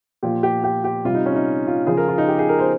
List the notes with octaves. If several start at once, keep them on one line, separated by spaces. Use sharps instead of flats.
A#2 F3 G4
G4
G4
G4
C3 G3 F4
D#4
C#4
D#4
F4
C#3 F3 G#4
A#4
F4
D#4
G4
G#4
A#4
C5